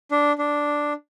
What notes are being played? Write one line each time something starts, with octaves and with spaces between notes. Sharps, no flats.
D4
D4